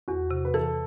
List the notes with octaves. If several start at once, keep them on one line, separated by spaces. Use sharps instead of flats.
E2 F#4
C3
B4
E3 A4